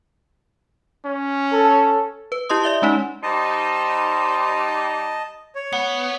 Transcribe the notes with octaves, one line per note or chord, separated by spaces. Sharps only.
C#4
A4
B4
E4 G4 D#5 C6 D#6
D5 E5 G7
G#3 C#4 D#4
G3 D#4 C5 D#5 A5
C#5
B3 F#5 C#7